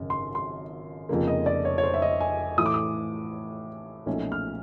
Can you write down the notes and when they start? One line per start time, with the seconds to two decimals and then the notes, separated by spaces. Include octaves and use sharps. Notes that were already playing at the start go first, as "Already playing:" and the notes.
Already playing: G#1 F#2 C#3
0.10 C6
0.35 C6
1.09 F1 F2 C#3 F3 A#3
1.28 D#5
1.46 D5
1.65 C#5
1.78 C#5
1.83 C5
1.94 E5
2.02 D#5
2.20 G#5
2.58 A2 E3 A3 D#6
2.66 D6
2.74 D#6
4.06 B1 A#2 F3 A3 C#4
4.32 F6